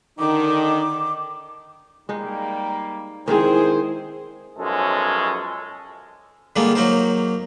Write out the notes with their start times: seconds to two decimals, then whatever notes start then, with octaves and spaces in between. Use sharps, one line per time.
0.19 D3 D#3 D#4 D6
2.09 G3 G#3 A#3 D#4
3.28 D#3 G#3 C4 E4 G#4 C5
4.59 B1 F#2 F3 G#3 C#4 A4
6.56 D3 G3 G#3 A#3 D#4 F4
6.75 F#3 A#3 D#4 A#4 C5